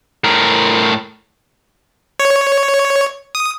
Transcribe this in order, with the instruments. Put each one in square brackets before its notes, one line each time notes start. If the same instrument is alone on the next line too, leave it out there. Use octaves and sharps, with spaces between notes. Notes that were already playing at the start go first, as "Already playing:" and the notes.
[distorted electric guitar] A2 A#4
[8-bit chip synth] C#5
D#6